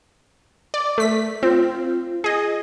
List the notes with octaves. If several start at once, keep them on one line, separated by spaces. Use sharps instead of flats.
D5
A3 B6
C4 F4
G#4 D#5